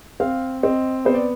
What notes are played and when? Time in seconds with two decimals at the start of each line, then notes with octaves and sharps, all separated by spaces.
0.20 C4 F5
0.63 C4 D#5
1.05 B3 C5
1.14 D5